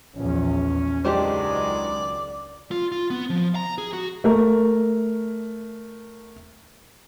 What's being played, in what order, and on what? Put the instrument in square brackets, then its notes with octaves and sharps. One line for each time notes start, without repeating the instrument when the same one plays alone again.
[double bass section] A#1 E2 [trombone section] C#4
[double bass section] C#2 [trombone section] D#3 F#3 G#3 [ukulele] D4 G4 C5 [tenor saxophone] D5
[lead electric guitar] F4
F4
B3
F3
A#5
G#4
F#4
[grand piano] A3 A#4